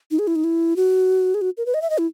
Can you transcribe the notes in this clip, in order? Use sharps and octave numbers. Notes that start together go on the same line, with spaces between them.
D#4
G#4
E4
D#4
E4
F#4
G#4
F#4
A#4
B4
D#5
E5
D#5
E4